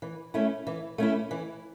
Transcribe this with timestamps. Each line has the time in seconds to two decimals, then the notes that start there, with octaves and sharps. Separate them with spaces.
0.02 E3
0.34 A3 C#4 E4
0.67 E3
0.98 A3 C#4 E4
1.31 E3